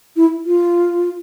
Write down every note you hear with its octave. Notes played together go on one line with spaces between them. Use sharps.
E4
F4